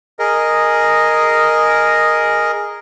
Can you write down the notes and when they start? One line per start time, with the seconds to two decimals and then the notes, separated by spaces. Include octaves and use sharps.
0.19 G#4 A#4 D#5